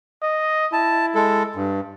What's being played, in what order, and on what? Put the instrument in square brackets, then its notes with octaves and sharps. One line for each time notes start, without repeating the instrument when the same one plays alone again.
[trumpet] D#5
[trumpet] E4 [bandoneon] A5
[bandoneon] G#3 A4
G2